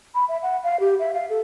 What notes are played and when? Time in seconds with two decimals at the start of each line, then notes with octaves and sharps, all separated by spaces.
0.15 B5
0.28 E5
0.43 F#5
0.64 F5
0.80 G4
1.00 E5
1.14 F5
1.30 A4